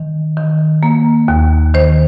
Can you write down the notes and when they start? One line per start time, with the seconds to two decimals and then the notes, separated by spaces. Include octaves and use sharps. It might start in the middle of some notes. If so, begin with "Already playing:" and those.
Already playing: D#3
0.37 D#3
0.83 A#3
1.28 D#2
1.74 D#3 C5